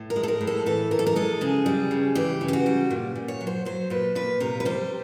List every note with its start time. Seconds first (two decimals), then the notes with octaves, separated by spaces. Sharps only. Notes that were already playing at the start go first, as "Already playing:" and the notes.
Already playing: A2
0.10 A#4
0.16 G#3
0.23 A4
0.28 A#4
0.41 A2
0.47 A4
0.66 E3 A4
0.91 A2 A#4
0.99 A4
1.06 A#4
1.16 G#3 A4
1.41 C#3 G#4
1.66 G3
1.91 C#3
2.15 E3 G4
2.41 C#3
2.48 G4
2.53 F#4
2.66 G3
2.90 A#2
3.16 A#2
3.28 C#5
3.41 F#3
3.47 C5
3.65 F#3 C5
3.90 A#2 B4
4.15 A#2 B4
4.40 C3 A#4
4.60 B4
4.65 G3 C5